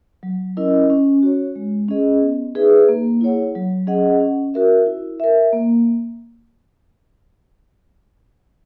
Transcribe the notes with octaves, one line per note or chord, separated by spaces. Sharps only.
F#3
C#4 E4 A#4 D#5
C#4
F#4 C#5
G#3
C#4 G#4 D#5
B3
D#4 G#4 B4 E5
A#3
E4 G#4 C#5 F#5
F#3
C#4 G#4 D#5 F#5
C#4
F#4 A#4 E5
E4
A#4 E5
A#3